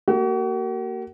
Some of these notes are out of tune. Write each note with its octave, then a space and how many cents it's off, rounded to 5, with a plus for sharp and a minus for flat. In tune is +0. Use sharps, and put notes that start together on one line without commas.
A#3 -25 F#4 +40